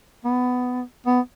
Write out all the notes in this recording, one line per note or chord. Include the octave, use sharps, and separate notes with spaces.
B3
B3